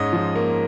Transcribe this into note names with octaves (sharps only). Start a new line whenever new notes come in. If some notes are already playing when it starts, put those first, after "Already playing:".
Already playing: G#2 C#4 D#5
F3
A#3